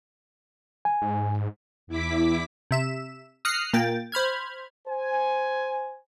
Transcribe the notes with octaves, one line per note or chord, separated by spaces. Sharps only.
G#5
G#2
E2 E4 D6 B6
C3 E5 E7
D#6 F6 F#6 A#6 C7 C#7
A#2 A#3 G5 A6
C5 B5 F6 G#6
C5 G#5